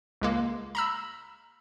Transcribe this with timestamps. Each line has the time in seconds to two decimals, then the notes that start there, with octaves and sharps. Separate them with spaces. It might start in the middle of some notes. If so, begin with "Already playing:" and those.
0.21 C#2 G#3 A#3
0.75 A#5 B5 E6